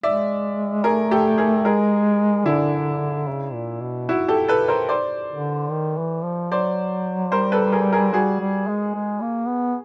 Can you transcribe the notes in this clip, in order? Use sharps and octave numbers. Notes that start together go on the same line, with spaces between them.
G#3 D5 E5
A3 G#4 A#4
G4 A4
G#4 A#4
G#3 G#4 A#4
D3 D4 E4
C#3
A#2
B2
E4 F#4
G4 A4
A4 B4
A#4 C5
C5 D5
D3
D#3
E3
F3
F#3 C5 D5
G3 A#4 C5
A4 B4
G#4 A#4
G#4 A#4
G3 F#4 G#4
G3
G#3
G#3
A#3
B3